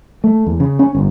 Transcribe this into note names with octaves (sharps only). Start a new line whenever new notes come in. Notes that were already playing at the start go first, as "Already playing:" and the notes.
A3
E2
C#3
C#4
G1